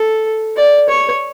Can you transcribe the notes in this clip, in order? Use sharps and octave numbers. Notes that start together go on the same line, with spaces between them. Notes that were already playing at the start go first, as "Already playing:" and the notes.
Already playing: A4
D5
C#5